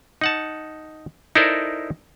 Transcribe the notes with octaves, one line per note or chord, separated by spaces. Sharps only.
D#4 F#5 A5
D#4 E4 A4 A#4 C5 D5